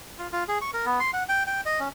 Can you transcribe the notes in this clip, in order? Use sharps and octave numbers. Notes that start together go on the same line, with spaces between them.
F4
F4
G#4
C#6
A#4
B3
C6
F#5
G5
G5
D#5
C#4